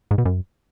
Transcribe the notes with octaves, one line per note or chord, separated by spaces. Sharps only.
G#2
B2
F#2